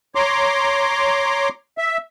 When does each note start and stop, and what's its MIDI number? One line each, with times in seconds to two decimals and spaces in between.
0.15 1.49 73
0.15 1.49 82
0.15 1.49 84
0.15 1.49 86
1.78 1.97 76